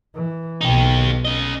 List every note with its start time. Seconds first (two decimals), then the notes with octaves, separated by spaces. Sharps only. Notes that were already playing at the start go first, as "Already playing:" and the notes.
0.14 E3
0.61 B1 B2 D#4 G4
1.25 C#4 D#5